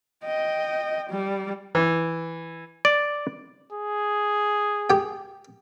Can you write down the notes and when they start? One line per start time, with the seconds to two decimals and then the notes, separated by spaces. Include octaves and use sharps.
0.25 D#5 G5
1.10 G3
1.75 E3
2.85 D5
3.72 G#4
4.90 G4 G5